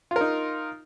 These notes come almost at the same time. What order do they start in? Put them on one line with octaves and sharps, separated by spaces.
F4 A#4 D#4